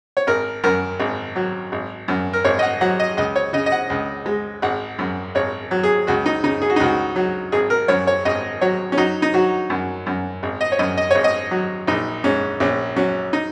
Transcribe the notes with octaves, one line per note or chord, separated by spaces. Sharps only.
C#5
G#1 A#4
F#2 A#4
G#1
F#3
G#1
F#2
A#4
G#1 C#5
D#5
F#5
F#3 F#5
D#5
C#2 D#5
C#5
C#3 D#5
D#5
F#5
C#2
G#3
G#1 F#5
F#2
G#1 C#5
F#3
G#4
C#2 F#4
D#4
C#3 D#4
G#4
F#4
D#4
C#2 F#4
F#3
G#1 G#4
A#4
F#2 C#5
C#5
G#1 D#5
F#3 C#5
C#4
F#3 D#4
D#4
F#3 F#4
F#2
F#2
G#1
D#5
C#5
F#2 D#5
D#5
G#1 C#5
D#5
F#3
A#1 D#4
G#2 C#4
A#1 C#4
F#3 C#4
D#4